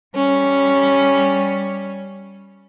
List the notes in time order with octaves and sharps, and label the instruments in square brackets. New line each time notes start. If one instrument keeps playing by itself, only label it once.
[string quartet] G3 C#4